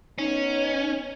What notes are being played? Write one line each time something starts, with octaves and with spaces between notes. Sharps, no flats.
B3 C#4 D#4